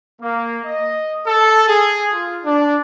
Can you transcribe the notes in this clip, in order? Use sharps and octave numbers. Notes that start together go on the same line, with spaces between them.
A#3
D#5
A4
G#4
F4
D4